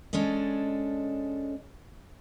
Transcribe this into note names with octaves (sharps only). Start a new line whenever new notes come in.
G#3 C#4 D4 A4 D#5